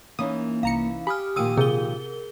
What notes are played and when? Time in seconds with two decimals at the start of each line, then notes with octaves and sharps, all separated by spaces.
0.19 E3 A#3 C#4 D#4 D#6
0.63 C2 F5 A#5 C#7
1.07 G4 G#5 B5 D#6 F6
1.36 A#2 D#3 F3 D#6 E6 D#7
1.57 C3 G#4 A#4 G7